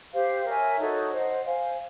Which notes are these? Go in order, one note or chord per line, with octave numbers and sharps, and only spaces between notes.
G4 C5 F5
A#4 C#5 E5 G#5
D#4 F#4 A4 C#5
C5 D#5 F#5
C5 F5 G#5